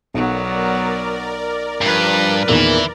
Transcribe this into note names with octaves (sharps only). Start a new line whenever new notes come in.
B1 F#3 B3 A#4 D5
G2 F3 B4
E2 A#2 D#3 E3 E4